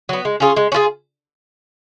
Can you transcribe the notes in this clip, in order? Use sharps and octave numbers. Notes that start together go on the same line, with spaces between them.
F#3 B3
G#3
C#4 F4 G#4
G#3
C#4
F4 G#4